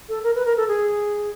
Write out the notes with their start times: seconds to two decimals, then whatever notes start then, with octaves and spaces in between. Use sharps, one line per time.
0.09 A4
0.23 A#4
0.35 B4
0.46 A#4
0.57 A4
0.68 G#4